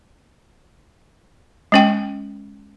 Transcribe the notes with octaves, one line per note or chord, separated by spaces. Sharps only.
G#3 C#4 G5